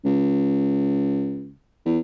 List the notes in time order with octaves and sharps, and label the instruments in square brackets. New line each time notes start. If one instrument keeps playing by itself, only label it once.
[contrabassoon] C#2
E2